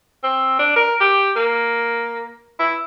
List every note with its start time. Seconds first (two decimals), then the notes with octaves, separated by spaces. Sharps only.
0.24 C4
0.59 D4
0.76 A#4
1.01 G4
1.36 A#3
2.60 E4